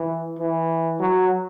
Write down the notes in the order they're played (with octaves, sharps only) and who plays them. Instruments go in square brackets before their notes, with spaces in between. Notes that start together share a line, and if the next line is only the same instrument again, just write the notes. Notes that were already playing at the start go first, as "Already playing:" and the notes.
Already playing: [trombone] E3
E3
F#3